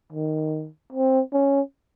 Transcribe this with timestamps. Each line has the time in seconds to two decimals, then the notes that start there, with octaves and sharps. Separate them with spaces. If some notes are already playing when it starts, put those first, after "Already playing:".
0.12 D#3
0.92 C4
1.33 C#4